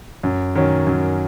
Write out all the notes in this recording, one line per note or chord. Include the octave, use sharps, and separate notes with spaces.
F#2
D#3 F#3 C#4
F#2